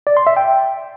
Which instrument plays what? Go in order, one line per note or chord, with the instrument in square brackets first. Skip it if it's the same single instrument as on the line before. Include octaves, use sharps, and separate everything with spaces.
[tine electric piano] D5
C6
E5
G5